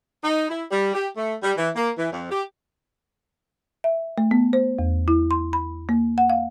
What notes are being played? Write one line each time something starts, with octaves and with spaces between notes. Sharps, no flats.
D#4
E4
G3
G4
A3
G3
E3
A#3
E3
F2
G4
E5
A3
B3
C5
E2
E4
C6
B5
A#3
F#5
F5